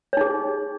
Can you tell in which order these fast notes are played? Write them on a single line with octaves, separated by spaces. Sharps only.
C#5 D#4 G#4